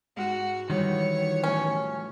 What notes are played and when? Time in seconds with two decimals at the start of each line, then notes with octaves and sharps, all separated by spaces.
0.16 G#2 F#4 F6 F#6
0.70 D#3 E3 F#3 G3 F4 C#5
1.44 A2 A3 C#4